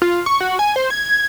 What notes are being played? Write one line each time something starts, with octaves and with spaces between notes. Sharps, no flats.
F4
C#6
F#4
G#5
C5
G#6